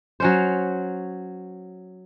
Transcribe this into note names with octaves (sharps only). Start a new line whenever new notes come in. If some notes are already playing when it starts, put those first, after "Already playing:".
F#3 C#4 C5